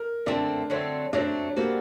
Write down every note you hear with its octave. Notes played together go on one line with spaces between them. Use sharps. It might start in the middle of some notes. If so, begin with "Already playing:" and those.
Already playing: A#4
D3 A3 C4 D4
D3 F#3 A3 C4
D3 F#3 A3 C4 D4
G3 A#3 C4 F#4 A4